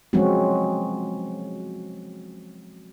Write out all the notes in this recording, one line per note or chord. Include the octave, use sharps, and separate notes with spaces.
F3 F#3 G#3 C4 C#4 F#4